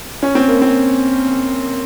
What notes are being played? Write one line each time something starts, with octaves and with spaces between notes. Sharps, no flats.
C#4
C4
A#3
C4